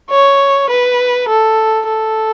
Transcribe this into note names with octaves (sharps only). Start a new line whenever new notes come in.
C#5
B4
A4
A4